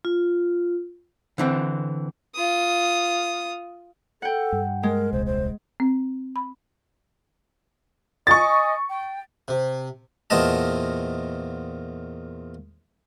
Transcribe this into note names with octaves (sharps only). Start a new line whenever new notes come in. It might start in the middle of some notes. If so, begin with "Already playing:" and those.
F4
D3 E3 C4
F4 D#6
A4 F#5 G5
G2
G#3 A#4
D#1 C2 C5
C5
C4
B5
D#5 G#5 C#6 D#6 A6
G5
C3
E2 A#2 C4 F#4 D#5 A5